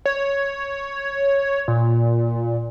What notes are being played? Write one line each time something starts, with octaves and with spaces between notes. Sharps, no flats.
C#5
A#2